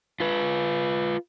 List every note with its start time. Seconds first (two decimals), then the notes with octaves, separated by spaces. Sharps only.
0.20 F4 B4